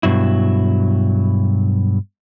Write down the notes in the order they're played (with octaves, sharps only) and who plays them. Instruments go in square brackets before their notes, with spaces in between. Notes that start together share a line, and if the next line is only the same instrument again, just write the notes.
[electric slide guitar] G2 B2 F#3 E4